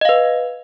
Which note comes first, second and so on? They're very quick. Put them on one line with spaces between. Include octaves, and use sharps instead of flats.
D#5 F5 B4